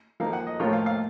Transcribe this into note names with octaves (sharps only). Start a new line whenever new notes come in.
F3 A#3 D#4 F5
F#5
D#5
A2 F3 A#3 F4 C#5
F5
F5